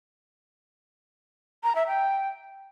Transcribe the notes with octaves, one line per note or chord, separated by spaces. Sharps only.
A#5
E5
G5